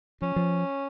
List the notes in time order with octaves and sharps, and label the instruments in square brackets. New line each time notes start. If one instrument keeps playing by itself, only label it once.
[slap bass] F3 [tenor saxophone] C#4
[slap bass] F3